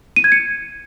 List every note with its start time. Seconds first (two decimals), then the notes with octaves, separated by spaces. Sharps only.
0.16 D#7
0.24 G#6
0.32 C#7